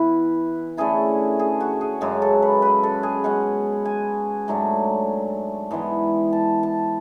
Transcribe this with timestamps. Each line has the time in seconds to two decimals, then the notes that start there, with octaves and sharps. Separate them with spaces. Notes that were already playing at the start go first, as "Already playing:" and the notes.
Already playing: E3 B3 E4 B4
0.77 D3 A3 C#4 E4 G#4
1.39 G#4
1.60 F#4
1.81 G#4
2.01 F#2 C#3 G#3 G#4
2.22 A4
2.42 B4
2.62 B4
2.83 A4
3.03 G#4
3.24 B2 G#3 C#4 F#5
3.85 G#5
4.48 G#2 F#3 A3 D4
5.71 G#2 E3 B3
6.33 A5
6.63 A5